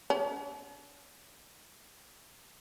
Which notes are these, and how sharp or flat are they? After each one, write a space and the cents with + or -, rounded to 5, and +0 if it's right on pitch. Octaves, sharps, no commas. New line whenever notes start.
D4 -45